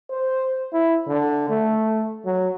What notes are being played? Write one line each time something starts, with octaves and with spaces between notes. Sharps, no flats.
C5
E4
D3
A3
F#3